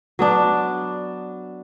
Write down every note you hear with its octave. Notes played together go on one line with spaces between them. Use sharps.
F#3 B3 D4